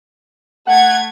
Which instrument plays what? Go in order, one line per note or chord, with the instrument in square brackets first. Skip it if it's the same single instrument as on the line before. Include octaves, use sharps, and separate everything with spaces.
[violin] A3 G#6 [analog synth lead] F#5